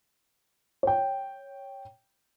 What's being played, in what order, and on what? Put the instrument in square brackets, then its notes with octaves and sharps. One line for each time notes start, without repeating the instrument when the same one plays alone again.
[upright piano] C#5 G5